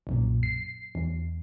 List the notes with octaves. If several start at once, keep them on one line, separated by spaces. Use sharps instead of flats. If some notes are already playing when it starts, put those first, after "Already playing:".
B1 F#2 A#2
C7
E2